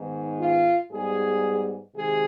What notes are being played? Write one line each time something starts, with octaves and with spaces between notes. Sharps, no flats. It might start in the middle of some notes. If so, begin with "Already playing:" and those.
Already playing: G#2 D#3 B3
F4
G#2 G3 B3 G#4
C3 D#3 G#3 G#4